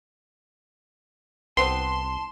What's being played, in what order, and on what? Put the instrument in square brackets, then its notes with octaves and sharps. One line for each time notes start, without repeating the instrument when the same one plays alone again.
[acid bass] C2 [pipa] B3 C4 B4 [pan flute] A5 [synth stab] C6